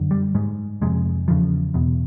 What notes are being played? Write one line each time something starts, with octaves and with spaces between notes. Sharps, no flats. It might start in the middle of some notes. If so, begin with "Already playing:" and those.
Already playing: F#2 D3
G3
G#2 G#3
F2 C3 G#3
E2 C#3 F3
E2 B2